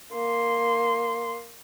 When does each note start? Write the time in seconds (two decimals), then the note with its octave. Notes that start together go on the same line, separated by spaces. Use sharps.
0.13 A#3 C6